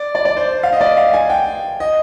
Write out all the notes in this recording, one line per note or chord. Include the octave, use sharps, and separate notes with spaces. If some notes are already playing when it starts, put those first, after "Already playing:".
Already playing: D5
D5
D5
C5
F5
D#5
D5
F5
G#5
G5
D#5